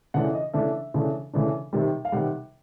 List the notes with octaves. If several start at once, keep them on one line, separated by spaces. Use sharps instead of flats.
C#3 E3 A3 D4 F#5
D#5
C#3 E3 A3 D4 E5
C#3 E3 A3 D4
C#3 E3 A3 D4
C3 D#3 G3
F5
C3 D#3 G3 F#5